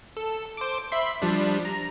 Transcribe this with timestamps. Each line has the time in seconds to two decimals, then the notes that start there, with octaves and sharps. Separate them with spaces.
0.17 A4
0.57 C5 D6
0.92 E5 B5 C6
1.22 F3 G3 D4
1.65 A#5